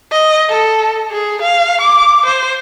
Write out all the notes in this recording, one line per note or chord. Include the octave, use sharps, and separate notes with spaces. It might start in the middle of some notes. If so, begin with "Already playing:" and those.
D#5
A4
G#4
F5
D6
C5